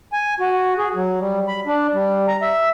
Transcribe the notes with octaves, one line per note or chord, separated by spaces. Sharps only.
G#5
F#4
G#4
F#3
G3
B5
D4
G3
A#5
E5